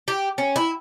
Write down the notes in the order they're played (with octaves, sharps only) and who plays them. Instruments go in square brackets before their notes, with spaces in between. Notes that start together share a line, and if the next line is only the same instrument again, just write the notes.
[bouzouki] G4
C#4
E4